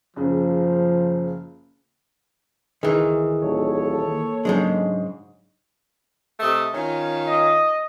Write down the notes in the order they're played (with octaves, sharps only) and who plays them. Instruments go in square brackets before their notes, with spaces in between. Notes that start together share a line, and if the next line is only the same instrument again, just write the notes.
[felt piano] F#1 C#3 [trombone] F3
[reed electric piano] C#2 G#4 [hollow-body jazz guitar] D#3 E3
[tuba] D#1 [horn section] A4 C#5
[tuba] A#3
[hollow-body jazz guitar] G#2 C#3 G#3 [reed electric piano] F#3 D4 D#5
[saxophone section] C3 A3 D#5
D#3 C#4 F4
[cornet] D#5